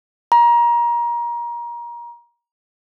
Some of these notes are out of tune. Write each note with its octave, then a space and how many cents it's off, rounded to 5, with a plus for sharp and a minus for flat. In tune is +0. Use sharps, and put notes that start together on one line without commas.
A#5 +25